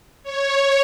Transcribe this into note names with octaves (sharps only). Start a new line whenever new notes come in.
C#5